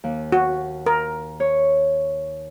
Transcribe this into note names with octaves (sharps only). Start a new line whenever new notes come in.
D#2
F#4
A#4
C#5